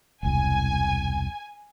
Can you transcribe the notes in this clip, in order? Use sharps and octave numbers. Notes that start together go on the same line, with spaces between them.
E1 C2 G#5